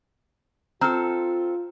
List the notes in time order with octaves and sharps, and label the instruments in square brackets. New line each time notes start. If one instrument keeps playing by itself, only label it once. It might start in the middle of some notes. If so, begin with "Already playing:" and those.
[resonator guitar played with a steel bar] C4 A4 [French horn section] F4 [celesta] A#5 F6